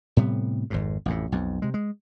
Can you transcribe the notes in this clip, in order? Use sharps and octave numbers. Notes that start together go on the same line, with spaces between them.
A2 C3 G3 B3
G#1 F2 G#2
A1 F2 A2
B1 F2
C3 G#3
G#3